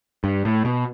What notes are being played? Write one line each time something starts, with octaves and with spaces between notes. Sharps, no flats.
G2
A2
B2